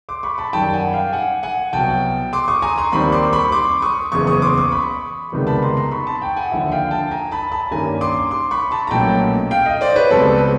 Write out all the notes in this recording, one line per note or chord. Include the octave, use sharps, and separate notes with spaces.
C6 D6
B5 C#6
A5 B5
F#2 D#3 G3 G5 A5
F#5 G#5
F5 G5
F#5 G#5
F#5 G#5
C2 B2 F#3 G5 A5
C6 D6
C#6 D#6
G#5 A#5
A#5 C6
D#2 D#3 G3 C4 B5 C#6
C6 D6
B5 C#6
C6 D6
C#6 D#6
F#1 E2 C#3 C#6 D#6
C#6 D#6
C6 D6
C#6 D#6
B5 C#6
C#2 C3 D#3 G3 B3
A5 B5
A#5 C6
A#5 C6
B5 C#6
A5 B5
G5 A5
F#5 G#5
D#2 D3 F3 E5 F#5
F5 G5
G5 A5
G#5 A#5
A5 B5
A5 B5
G2 D#3 G3 A#3 C#4 G#5 A#5
C6 D6
C6 D6
B5 C#6
A5 B5
A#5
B1 A#2 F#3 A3 C#4 G5 A5
F5 G5
D#5 F5
C5 D5
B4 C#5
C#2 B2 G3 C4 A4 B4